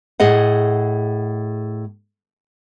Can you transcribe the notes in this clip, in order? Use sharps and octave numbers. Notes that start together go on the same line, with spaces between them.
A2 G#4 D#5 F#5